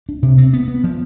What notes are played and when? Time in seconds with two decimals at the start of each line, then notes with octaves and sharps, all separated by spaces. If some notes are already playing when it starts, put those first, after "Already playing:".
0.09 D4
0.23 C3
0.38 C4
0.53 B3
0.68 B3
0.84 F3